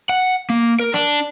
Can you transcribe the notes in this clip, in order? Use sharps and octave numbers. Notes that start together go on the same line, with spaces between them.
F#5
A#3
A#4
D4